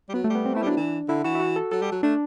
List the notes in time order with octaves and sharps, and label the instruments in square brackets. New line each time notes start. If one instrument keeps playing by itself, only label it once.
[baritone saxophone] G3
[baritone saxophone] F#3 [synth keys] B3
[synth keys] A3
[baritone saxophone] G3 [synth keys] B3
[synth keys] C4
[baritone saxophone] A3 [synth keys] E4
[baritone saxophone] G3
[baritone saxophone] F#3 [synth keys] D4
[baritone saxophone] E3
[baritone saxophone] D3 [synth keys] E4
[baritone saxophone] E3 [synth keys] F#4
[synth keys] E4
F#4
A4
[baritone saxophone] F#3 [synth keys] A4
[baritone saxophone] G3
F#3
[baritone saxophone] A3 [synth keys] D4